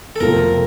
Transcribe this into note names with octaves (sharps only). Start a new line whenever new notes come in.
A4
F2 C3 F3 A3 C4 A#4